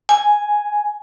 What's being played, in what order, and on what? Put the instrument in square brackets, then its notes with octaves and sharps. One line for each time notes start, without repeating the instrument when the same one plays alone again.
[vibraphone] G#5